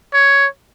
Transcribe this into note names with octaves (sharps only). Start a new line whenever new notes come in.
C#5